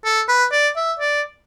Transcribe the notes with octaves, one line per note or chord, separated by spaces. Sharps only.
A4
B4
D5
E5
D5